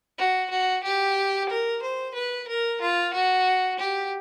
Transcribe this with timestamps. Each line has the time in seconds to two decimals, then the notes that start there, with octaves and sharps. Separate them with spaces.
0.18 F#4
0.51 F#4
0.84 G4
1.49 A#4
1.83 C5
2.15 B4
2.48 A#4
2.81 F4
3.14 F#4
3.79 G4